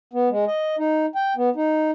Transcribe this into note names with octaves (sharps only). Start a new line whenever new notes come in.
B3
G#3
D#5
D#4
G5
B3
D#4